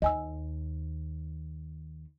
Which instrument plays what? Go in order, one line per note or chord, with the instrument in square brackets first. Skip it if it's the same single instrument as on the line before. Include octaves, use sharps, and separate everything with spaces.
[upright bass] D#2 [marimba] D#5 G#5 E6